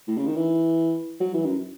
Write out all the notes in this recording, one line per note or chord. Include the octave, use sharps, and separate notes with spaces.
A2
C#3
D#3
E3
F#3
E3
F#2